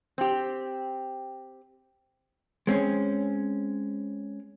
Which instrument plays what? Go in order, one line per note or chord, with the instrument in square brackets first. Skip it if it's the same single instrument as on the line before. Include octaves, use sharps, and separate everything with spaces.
[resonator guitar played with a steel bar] C4 G4
[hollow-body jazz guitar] G#3 C4 C#4